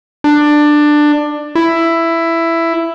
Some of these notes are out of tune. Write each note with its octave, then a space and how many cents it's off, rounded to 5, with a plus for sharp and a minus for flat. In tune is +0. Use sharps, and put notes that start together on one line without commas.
D4 +15
E4 +10